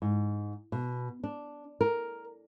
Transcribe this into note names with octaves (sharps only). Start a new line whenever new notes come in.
G#2
B2
D4
A#4